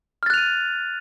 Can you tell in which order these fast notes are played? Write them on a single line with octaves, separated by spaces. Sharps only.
F6 A6 F#6 F7 D#7